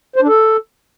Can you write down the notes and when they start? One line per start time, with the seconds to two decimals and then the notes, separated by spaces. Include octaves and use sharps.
0.16 C5
0.22 D4
0.28 A4